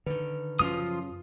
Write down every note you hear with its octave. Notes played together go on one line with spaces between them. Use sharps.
D3 D#3 B4
F#2 C#3 F3 C#4 F4 D#6